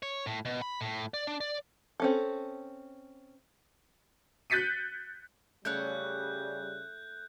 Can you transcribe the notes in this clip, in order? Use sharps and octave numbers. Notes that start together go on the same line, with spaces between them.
C#5
A2
B2
B5
A2
D5
D4
D5
C4 C#4 A4
F#6 G6 A6 B6 C#7 D#7
C#3 G3 A3 E4 C#5 F#6 G6